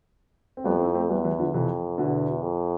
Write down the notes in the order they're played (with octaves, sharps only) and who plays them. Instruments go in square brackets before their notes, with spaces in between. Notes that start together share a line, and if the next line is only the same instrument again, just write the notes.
[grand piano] C4
[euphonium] F2 [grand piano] G3 B3
[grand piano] C4 E4
A3 C4
[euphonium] E2 [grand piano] G3 B3
[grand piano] E3 G3
D3 F3
[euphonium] F2 [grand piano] C3 E3
[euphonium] E2 [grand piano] B2 D3
[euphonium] F2